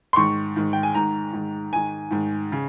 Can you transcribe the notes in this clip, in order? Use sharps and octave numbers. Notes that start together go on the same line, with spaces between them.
C6
G#2 D#3 C#6
G#2 D#3
G5
G#5
G#2 D#3 A#5
G#2 D#3
G#2 D#3 G#5
G#2 D#3
C#3